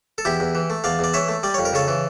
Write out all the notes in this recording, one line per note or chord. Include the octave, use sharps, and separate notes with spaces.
A4
E2 E4 G4
E2
E3
A3
E2 D5 F5
E2 D5
E3 C#5 E5
A3
G3 D5
F2 C#5
A#4
C#3 A4 C#5
E3